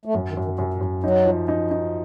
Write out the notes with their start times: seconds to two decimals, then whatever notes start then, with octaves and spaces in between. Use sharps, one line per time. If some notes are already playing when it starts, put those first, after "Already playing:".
0.05 A3
0.14 F#2 F#3
0.29 D#3
0.37 F#2
0.44 D#3
0.58 F#2 C3
0.74 A#2
0.81 F#2
1.04 F#3 D#4
1.25 F3
1.48 D#4
1.71 D#4